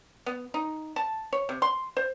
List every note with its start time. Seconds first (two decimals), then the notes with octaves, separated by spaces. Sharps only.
0.26 B3
0.54 D#4
0.96 A5
1.33 C#5
1.49 C3
1.62 C6
1.97 C5